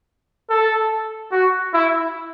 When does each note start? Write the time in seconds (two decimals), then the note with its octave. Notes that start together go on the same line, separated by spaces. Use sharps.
0.50 A4
1.31 F#4
1.74 E4